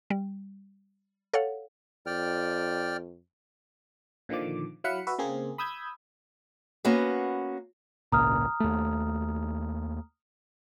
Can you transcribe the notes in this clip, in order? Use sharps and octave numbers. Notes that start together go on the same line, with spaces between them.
G3
A4 C#5 F5 F#5
F2 D5 G5 F6
A#2 D3 D#3 F3 D6
F#3 E4 F5 F#5 B5 C#7
F#4 B4 E5
C#3 A#3 C4 G#4
B5 D#6 E6 G6 G#6
A#3 B3 C#4 F#4 B4
G#1 C#2 A#2 A#5 D#6 F6
D#2 A3